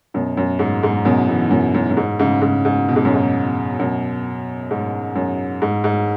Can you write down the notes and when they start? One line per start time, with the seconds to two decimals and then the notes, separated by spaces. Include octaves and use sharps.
0.14 F#2 B2
0.37 F#2
0.59 G#2
0.83 G#2
1.05 F#2 B2
1.28 B2 E3
1.51 F#2 B2
1.74 F#2
1.91 F#2
1.97 G#2
2.19 G#2 C#3
2.42 G#2 C#3
2.65 G#2
2.88 B2
2.96 G#2
3.05 F#2
3.14 G#2
3.79 F#2 B2
4.71 G#2
5.15 F#2
5.62 G#2
5.84 G#2